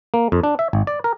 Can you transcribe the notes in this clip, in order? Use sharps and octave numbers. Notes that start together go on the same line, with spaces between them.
A#3
F2
D4
E5
G#1
D5
A#4